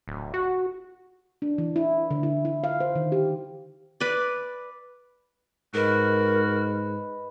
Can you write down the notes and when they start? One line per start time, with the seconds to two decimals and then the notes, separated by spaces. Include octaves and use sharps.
0.08 D1
0.34 F#4
1.42 D4
1.58 E3
1.76 E4
2.11 D3
2.23 E4
2.45 E4
2.64 F5
2.80 C5
2.95 D#3
3.12 G4
4.00 B4 D5
5.74 G#2 F#4 A#4 B4 D#5 B5